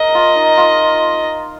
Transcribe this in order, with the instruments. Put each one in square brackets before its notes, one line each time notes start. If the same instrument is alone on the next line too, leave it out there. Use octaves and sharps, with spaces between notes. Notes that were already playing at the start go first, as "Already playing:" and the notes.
Already playing: [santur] A#4 [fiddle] D#5
[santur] F4
D#4
F4